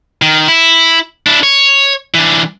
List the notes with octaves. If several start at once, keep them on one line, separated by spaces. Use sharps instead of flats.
D#3
E4
D4 E4
C#5
E3 D4